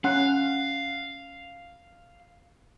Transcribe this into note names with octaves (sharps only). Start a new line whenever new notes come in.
C#4 F5 F#5